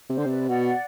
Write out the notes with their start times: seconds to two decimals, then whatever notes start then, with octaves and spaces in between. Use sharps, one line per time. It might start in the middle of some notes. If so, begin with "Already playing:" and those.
0.10 C3 C5
0.17 D3
0.25 C3 B4 D5
0.48 B2 D5 F#5